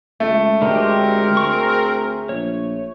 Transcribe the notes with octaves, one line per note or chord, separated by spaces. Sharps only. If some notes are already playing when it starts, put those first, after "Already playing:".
C#2 A3
D2 D3 G#3 C4 G4 A#4
G#4 C#6
A#1 C#5